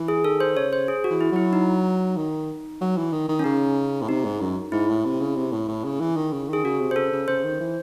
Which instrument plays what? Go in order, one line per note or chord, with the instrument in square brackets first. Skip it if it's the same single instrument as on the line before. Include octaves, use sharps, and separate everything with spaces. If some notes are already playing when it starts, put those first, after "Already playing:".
Already playing: [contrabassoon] E3
[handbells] G#4
[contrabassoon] D#3 [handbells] A4
[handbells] C5
[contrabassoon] C#3 [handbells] C#5
[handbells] C5
G#4
F#4
[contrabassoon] E3
[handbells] E4
[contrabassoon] F#3 [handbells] E4
[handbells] D#4
[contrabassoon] D#3
F#3
E3
D#3
D#3
[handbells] C#4
[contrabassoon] C#3 [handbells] D#4
[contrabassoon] A2
[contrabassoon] C3 [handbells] D#4
[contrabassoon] G#2
F#2
[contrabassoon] G#2 [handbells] E4
[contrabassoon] A2
C3
C#3
C3
A2
A2
C#3
E3
D#3
C#3
[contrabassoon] D#3 [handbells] G#4
[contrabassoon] C#3 [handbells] F#4
[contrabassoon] C3
[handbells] C5
[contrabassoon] C#3 [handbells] A4
[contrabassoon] C#3
[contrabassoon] C#3 [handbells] C5
[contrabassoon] D#3
E3